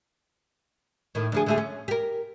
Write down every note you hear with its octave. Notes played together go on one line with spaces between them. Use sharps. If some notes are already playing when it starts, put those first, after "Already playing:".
A2 D#3
D2 F3 G#4
D3 A3 G#4
C#4
G4 A#4